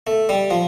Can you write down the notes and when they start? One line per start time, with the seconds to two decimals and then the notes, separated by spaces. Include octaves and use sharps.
0.07 A3
0.29 G3
0.50 F3